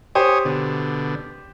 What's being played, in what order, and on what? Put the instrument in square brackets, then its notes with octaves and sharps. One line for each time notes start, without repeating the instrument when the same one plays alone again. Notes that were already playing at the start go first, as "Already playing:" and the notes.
[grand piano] G4 C5 [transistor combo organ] C#5 G#5 D#6
[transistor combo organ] B2 D3